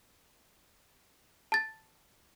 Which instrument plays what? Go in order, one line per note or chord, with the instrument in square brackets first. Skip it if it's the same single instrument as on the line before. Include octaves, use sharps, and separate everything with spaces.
[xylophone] A5 A6